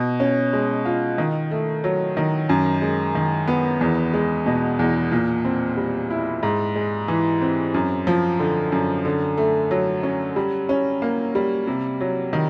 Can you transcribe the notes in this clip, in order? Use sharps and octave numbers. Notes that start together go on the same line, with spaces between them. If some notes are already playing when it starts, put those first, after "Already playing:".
Already playing: B2
C#4
G#3
F4
D#3
A3
F#3
D#3
F#2
G#3
D#3
B3
E2
G#3
B2
E2
A#2
C4
G3
E4
G#2
G#3
E3
C4
F#2
F3
D3
F#2
D3
A3
F#3
C#4
G3
C#4
A#3
G3
C3
F#3
D#3